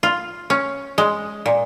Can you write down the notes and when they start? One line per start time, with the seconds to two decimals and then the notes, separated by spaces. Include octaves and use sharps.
0.03 F4
0.50 C#4
0.98 G#3
1.46 A#2